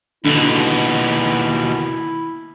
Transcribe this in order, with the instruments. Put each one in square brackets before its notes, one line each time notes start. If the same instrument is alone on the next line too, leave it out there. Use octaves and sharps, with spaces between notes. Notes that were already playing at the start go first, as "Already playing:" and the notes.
[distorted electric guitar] D#2 B2 [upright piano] D3 [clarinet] E4